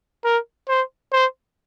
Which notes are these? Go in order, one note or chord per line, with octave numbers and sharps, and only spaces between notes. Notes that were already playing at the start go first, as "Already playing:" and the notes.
A#4
C5
C5